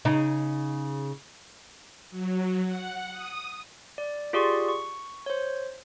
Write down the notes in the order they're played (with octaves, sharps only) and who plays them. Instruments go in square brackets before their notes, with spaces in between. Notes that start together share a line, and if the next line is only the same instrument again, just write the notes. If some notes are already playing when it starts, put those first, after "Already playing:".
[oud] C#3 D#4
[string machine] F#3
F#5
D#6
[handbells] D5
F4 G4 G#4 D5 C6 C#6
C#6
C5 C#5